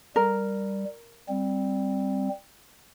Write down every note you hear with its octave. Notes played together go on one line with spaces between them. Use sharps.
G3 A#4
G3 C4